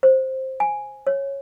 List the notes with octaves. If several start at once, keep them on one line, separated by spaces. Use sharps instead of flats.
C5
G#5
C#5